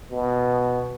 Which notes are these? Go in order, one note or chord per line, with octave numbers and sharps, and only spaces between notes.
B2